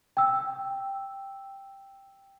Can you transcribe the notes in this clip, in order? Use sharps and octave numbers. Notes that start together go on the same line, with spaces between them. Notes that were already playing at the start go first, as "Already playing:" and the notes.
G5 E6